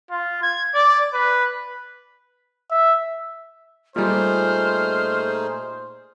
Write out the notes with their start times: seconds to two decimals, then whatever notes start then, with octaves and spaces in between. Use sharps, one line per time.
0.10 F4
0.42 G#6
0.74 D5
1.13 B4
2.71 E5
3.96 A#2 G3 A3 D#4 G#4 C5 F6